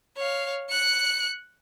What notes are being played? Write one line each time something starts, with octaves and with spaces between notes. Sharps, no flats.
C#5 F5
F#6 C#7